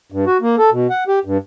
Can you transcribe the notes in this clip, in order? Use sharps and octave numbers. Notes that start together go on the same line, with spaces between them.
G2
F#4
A#3
A4
B2
F#5
G4
G2